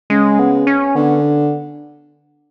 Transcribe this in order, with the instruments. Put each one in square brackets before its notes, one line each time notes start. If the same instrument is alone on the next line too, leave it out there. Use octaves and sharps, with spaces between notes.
[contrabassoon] C#3 [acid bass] G#3
[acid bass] B3
C#4
[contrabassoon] D3 [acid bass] B3